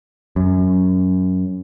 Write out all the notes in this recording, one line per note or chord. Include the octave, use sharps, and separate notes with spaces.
F#2